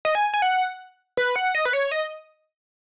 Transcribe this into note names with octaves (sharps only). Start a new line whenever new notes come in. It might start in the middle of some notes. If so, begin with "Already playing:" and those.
D#5
G#5
G#5
F#5
B4
F#5
D#5
B4
C#5
D#5